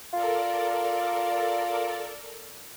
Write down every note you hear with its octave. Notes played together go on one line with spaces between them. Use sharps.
F4 A4 A#4 D5